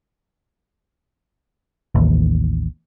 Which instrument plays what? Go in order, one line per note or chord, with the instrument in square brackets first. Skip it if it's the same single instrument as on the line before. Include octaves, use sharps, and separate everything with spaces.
[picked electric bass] A1 D#2